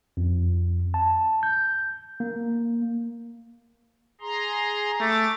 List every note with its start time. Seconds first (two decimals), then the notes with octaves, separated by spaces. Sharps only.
0.17 F2
0.94 A5
1.43 G6
2.20 A#3
4.21 G#4 A#5 C6
5.01 A3 D6 A6